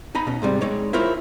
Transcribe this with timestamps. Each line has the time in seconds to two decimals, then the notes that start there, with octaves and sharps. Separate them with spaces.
0.15 D#4 G#5 A#5 B5
0.27 B2 C#4
0.42 G#2 C3 G3
0.61 G#3 D#4 C#5 D5
0.93 E4 F4 A#4 C5 C#5